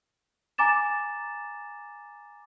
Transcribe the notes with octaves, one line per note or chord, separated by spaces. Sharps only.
G#5 A#5 D6 A6 E7